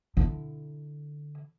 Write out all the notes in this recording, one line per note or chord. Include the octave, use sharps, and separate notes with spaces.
D3 E4